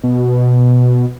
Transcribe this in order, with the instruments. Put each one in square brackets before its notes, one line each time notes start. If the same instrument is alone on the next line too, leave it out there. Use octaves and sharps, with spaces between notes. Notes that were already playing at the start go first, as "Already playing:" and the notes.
[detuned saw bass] B2